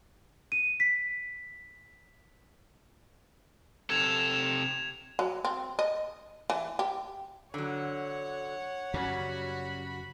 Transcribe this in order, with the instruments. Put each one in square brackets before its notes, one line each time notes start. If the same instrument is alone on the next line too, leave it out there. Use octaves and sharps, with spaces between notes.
[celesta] D#7
B6
[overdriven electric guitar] C3 A4 [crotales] G#6 E7 F7
[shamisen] F#3
C4
D#5
E3
G4
[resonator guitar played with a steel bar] D3 F#3 [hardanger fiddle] C#5 F#5
[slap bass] F#2 C#3 [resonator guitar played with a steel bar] G3 C#4 [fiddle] F#4 B5